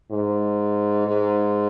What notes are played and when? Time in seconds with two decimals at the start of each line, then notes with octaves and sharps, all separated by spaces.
0.11 G#2
1.07 G#2